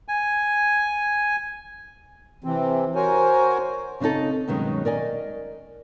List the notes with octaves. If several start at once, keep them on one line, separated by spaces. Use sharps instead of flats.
G#5
C3 E3 C4
F#4 A#4 C5 C#5 G#5
C#3 C4 D4 D#4 A4
G2 B2 D#3 F#3 G#3 C#4
A#4 D5 D#5 G#5